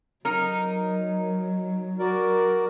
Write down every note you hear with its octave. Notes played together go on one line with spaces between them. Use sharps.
F#3 D#4 A#4
F#4 A#4 D5